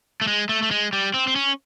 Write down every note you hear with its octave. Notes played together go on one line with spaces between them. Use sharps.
A3
G#3
A3
A3
G#3
G3
C4
C4
C#4